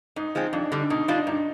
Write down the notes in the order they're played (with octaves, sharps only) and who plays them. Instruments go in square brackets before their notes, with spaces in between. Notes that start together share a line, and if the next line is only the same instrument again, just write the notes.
[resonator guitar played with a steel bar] G#2 [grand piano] D#4
[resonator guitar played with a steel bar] F3 G#3 C4
[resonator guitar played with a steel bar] F2 [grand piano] D4
[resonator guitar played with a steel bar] D3 G3 [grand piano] D4
[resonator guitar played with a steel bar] B2 [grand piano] D#4
[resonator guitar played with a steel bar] G3 D4 F4 [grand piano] D#4
[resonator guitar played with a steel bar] G2 [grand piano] D#4